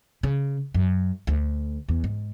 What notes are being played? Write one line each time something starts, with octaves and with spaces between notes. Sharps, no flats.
C#3
F#2
D2
E2
G#2